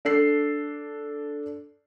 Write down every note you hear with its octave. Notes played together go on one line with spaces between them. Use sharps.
D4 A4 C7